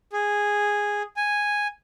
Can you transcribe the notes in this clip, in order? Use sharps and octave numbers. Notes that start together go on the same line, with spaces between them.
G#4
G#5